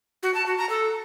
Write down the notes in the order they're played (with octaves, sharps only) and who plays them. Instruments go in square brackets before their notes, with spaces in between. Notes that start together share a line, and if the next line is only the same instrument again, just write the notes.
[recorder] F#4
A5
F#4
A#5
A4